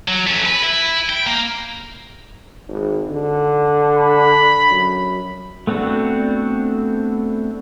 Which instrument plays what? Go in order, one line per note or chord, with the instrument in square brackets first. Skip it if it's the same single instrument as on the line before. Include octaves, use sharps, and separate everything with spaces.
[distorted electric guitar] F#3
A3 C#4
B4
E4
G5
A#3
[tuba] G#1
D3
[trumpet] B5
[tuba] F#2
[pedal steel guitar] A3 B3 C4 D4 F#4